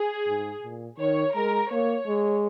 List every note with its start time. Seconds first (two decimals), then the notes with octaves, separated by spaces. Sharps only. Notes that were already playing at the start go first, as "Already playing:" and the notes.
Already playing: G#4
0.27 G#2
0.62 A#2
0.99 D#3 C#5
1.35 G#3 A#4
1.71 A#3 C#5
2.07 G#3